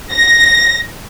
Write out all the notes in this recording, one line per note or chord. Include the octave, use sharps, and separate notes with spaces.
A#6